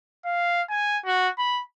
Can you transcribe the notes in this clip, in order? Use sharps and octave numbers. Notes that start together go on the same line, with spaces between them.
F5
G#5
F#4
B5